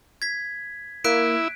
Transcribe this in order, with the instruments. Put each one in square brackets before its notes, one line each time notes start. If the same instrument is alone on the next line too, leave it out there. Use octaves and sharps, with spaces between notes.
[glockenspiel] G#6 B6
[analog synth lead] A#3 [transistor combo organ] E4 [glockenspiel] F#6 B6 D7